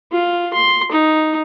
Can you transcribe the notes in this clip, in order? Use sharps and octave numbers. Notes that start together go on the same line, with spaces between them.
F4
C6
D#4